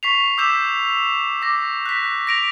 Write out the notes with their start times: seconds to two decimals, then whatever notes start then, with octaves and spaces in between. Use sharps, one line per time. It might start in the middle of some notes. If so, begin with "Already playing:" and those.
0.03 C#6 B6 C7 F7
0.37 D6 E6 G6 B6 E7
1.42 D6 A#6
1.86 F#6 B6
2.27 A#6 D7 F7